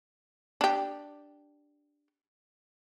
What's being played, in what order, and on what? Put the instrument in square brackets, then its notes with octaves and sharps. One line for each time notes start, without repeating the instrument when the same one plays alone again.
[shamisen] D4 G4